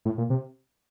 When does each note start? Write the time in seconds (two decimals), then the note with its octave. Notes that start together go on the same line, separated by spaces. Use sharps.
0.05 A2
0.18 A#2
0.30 C3